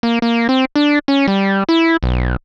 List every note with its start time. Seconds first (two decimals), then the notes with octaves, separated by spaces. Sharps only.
0.03 A#3
0.22 A#3
0.49 C4
0.76 D4
1.08 C#4
1.28 G3
1.69 E4
2.03 B1